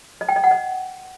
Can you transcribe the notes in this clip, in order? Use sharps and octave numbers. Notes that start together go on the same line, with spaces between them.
D#5
G5
D#5
F#5
D#5